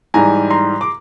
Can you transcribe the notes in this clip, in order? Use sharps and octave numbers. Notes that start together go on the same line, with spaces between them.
G#2 E3 G3 G#5 A#5
A#5 C6
D6